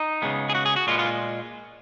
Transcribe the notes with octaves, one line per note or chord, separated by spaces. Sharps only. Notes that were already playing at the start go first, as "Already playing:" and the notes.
Already playing: D#4
C#3 G#3 B3
G#4
F#4
G#4
F#4
A#2 G#3 B3 F4
F4